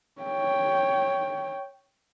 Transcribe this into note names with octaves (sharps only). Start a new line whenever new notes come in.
C#5 G5